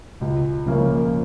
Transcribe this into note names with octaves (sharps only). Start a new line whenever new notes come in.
C#2
C#3 F3 A#3 C#4